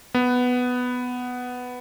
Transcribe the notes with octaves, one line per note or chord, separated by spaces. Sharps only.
B3